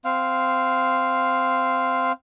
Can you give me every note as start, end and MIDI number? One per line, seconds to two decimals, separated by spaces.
0.05 2.12 60
0.05 2.12 77